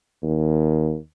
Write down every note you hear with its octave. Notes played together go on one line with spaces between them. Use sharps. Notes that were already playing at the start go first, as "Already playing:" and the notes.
D#2